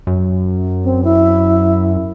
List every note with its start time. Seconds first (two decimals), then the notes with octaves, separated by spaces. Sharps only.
0.07 F#2
0.84 C4
1.04 E4